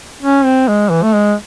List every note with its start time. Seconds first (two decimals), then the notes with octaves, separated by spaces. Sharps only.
0.23 C#4
0.45 C4
0.68 G#3
0.91 E3
1.03 A3
1.13 G#3